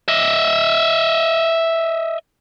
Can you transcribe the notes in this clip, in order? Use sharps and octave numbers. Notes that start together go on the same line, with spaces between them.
D#5 E5